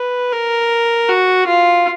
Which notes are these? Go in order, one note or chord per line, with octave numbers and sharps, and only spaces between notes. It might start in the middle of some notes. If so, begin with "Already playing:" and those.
Already playing: B4
A#4
F#4
F4